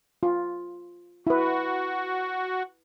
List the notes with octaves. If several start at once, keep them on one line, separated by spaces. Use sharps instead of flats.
F4
E4 F#4 B4